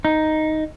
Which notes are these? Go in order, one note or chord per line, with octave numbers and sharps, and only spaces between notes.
D#4